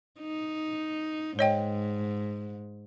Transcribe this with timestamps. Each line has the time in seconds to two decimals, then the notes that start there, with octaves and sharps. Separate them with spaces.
0.21 D#4
1.39 G#2 C#5 D#5 G5